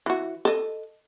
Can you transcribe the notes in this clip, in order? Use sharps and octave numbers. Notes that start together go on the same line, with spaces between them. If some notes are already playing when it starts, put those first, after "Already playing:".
E3 F#4
A4 D#5